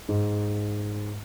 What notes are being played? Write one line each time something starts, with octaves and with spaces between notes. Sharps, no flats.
G#2